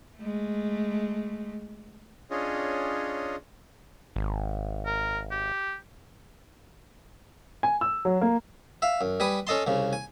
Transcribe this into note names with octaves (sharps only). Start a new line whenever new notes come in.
G#3 A3
C#4 D4 F4 G#4 C#5 D#5
G#1
A#4
G4
G#5
E6
F#3
A#3
E5 F5
F#2
G3 B4 G#5 D#6
C#4 A4 D#5 A5 C6
C2 C#3
G#5